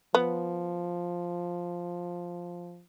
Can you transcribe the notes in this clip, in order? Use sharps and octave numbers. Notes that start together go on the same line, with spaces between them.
F3 B3